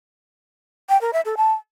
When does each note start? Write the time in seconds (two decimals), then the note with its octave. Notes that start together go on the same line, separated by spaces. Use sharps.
0.89 G5
1.01 A#4
1.13 E5
1.25 A4
1.37 A5